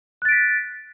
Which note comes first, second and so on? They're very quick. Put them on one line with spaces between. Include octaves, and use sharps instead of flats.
F#6 A6 D7 B6